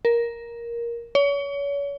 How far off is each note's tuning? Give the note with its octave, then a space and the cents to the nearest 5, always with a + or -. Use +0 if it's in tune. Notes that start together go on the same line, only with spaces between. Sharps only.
A#4 +10
C#5 +35